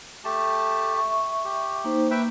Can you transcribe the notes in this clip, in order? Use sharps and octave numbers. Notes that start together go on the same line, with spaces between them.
A3 G4 A5
E5 C#6
G4
A#3 D#4 C5
A#3 B4 E5 G5